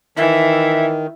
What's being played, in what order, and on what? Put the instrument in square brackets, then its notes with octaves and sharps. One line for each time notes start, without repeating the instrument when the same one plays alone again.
[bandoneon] D#3 [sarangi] E3 [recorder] E5